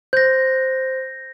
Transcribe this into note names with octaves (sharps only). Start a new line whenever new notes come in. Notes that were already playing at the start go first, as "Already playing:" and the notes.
C5 G6 A#6